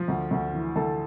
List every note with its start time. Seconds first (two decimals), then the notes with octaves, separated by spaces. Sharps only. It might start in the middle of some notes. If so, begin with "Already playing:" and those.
Already playing: F3
0.08 D2
0.31 D2
0.53 E3
0.76 D2 A4